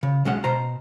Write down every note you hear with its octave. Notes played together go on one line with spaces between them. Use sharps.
C#3
B1 G#3 C#4 F#5
B2 C5 A#5